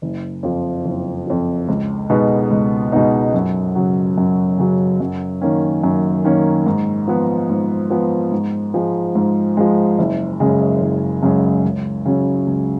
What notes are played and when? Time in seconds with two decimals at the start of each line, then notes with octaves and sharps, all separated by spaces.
0.02 F#1
0.43 F2 F3
0.85 F#1
1.26 F2 F3
1.68 C#2
2.10 B2 G#3 B3 D#4
2.51 C#2
2.92 B2 G#3 B3 D#4
3.34 F#2
3.76 C#3 F#3
4.18 F#2
4.59 C#3 F#3
5.00 F#2
5.42 D#3 A#3 C#4
5.84 F#2
6.25 D#3 A#3 C#4
6.66 G#2
7.08 F3 B3
7.50 G#2
7.90 F3 B3
8.32 G#2
8.74 F3 G#3
9.15 G#2
9.57 F3 G#3
9.98 F#1
10.40 F#2 C#3 G#3
10.81 F#1
11.23 F#2 C#3 G#3
11.64 C#2
12.06 C#3 F#3 C#4
12.46 C#2